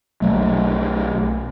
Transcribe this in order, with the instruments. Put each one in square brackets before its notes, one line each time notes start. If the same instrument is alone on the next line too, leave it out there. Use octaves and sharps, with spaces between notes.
[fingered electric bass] B1 F#3 A3